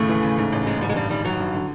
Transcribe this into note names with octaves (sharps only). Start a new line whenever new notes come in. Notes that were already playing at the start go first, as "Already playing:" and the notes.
Already playing: D#2 A2 C#3 A3
E3
C#3
G#2
A1
G#2 G#3
A1 G3
G#3
G2 G3
D#3 G3
D#3 F#3
G2
D3